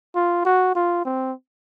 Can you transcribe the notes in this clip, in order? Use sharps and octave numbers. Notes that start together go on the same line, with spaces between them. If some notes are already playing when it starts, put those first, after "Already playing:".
F4
F#4
F4
C4